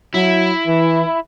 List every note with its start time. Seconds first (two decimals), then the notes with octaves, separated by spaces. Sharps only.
0.14 F#3 E4
0.67 E3